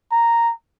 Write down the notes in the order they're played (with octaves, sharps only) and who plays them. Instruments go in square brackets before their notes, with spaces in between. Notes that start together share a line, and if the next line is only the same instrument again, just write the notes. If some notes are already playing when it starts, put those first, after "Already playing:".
[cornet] A#5